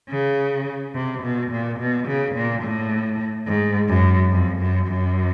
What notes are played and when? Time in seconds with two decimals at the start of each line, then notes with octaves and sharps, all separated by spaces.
0.10 C#3
0.94 C3
1.23 B2
1.51 A#2
1.79 B2
2.08 C#3
2.35 A#2
2.63 A2
3.47 G#2
3.89 F#2
4.32 F2
4.59 F#2
4.87 F#2